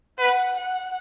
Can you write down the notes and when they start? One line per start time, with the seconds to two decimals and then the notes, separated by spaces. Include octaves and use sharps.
0.19 B4 F#5
0.57 F#5